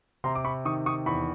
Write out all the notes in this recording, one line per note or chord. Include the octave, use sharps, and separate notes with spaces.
C3 A#5 C6
D6
B5 C#6
D#3 C#6 D#6
C#6 D#6
E2 B5 C#6